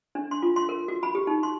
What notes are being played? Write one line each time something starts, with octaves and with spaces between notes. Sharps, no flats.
D4
C6
F4
C6
A#4
F#4
B5
G4
D#4
C6